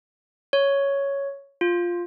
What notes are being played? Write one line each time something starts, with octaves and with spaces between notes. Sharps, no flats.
C#5
F4